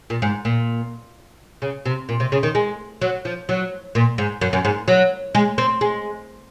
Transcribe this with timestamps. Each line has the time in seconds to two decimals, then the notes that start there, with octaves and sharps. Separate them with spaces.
0.10 A#2
0.22 G#2
0.45 A#2
1.62 C#3
1.86 C3
2.09 A#2
2.20 C3
2.32 C#3
2.43 D#3
2.55 G#3
3.01 F#3
3.25 F3
3.49 F#3
3.95 A#2
4.18 G#2
4.41 F#2
4.53 F#2
4.65 G#2
4.88 F#3
5.35 G#3
5.58 C4
5.81 G#3